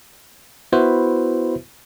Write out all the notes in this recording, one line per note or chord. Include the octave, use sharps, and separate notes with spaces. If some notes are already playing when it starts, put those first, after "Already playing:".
B3 E4 F#4 B4 C5 E5